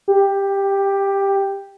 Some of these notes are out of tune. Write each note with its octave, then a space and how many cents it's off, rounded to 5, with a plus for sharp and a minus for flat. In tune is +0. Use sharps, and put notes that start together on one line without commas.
G4 +10